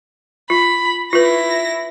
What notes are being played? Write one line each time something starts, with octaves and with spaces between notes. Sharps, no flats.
F4 B5
E4 F4 B4 A#6